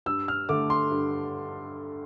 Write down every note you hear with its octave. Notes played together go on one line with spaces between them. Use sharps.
G2 E6
F6
D3 A3 D6
C6
G2